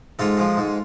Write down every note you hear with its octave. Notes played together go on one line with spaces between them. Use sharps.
G#2 F4 A4
F3 G#3
G#2